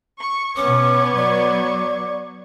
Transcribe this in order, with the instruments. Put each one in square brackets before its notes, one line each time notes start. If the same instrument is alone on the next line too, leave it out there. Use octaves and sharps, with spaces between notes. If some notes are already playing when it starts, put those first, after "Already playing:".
[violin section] C#6
[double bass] B2 C#4 [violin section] B3 C#6 G#6 [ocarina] C#5 [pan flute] D6
[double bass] F#3 [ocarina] D5